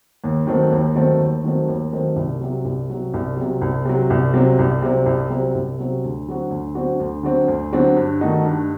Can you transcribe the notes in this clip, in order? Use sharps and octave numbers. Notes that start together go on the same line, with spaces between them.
D#2
D#3 F#3 A3 C4
D#2
D#3 F#3 A3 C4
D#2
D#3 F#3 A3 C4
D#2
D#3 F#3 A3 C4
C2
C3 F#3
C2
C3 F#3
C2
C3 F#3
C2
C3 F#3
C2
C3 F#3 C4
C2
C3 F#3 C4
C2
C3 F#3 C4
C2
C3 F#3 C4
D2
D3 F#3 C4 F#4
D2
D3 F#3 C4 F#4
D2
D3 F#3 C4 F#4
D2
D3 F#3 C4 F#4
G2
D#3 A3 D#4 F#4
G2